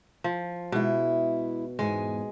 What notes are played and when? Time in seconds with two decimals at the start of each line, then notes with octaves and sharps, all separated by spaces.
0.24 F3
0.72 B2 G#3 E4
1.79 E2 G#2 G#3 G#5